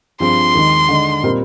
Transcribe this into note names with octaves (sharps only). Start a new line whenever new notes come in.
G2 F3 C4 F4 G#4 C6
D#2 D#3 G#3 D#4
D3 G#3 D#4
A#2 G3 C4 D#4 A#4